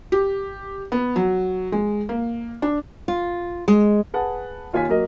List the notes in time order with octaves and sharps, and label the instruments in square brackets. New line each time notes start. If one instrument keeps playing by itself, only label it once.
[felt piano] G4
B3
F#3
G#3
A#3
D4
[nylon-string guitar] F4
G#3
[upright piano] G#4 B4 F#5 A5
D#2 F4 C#5 G#5 B6
F#3 A#3 F#4 A#4 D#5